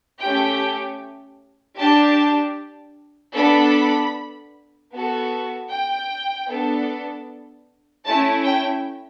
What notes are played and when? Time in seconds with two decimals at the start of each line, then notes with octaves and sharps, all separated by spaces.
0.21 A3 C#4 G4 G5
1.78 D4 G4 A5
3.35 B3 D4 A4 B5
4.92 B3 F#4 A4
5.70 G5
6.49 B3 D4 A4
8.05 A3 C#4 E4 A5
8.44 G5